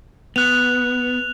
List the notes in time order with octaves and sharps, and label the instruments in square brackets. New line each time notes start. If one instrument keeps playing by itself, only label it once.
[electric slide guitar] B3 [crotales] F#6 F7